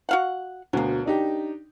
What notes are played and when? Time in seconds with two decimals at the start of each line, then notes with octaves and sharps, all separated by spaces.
0.09 F#4 F5 F#5
0.73 D2 B2 F#3 A#3
1.06 D4 D#4 G4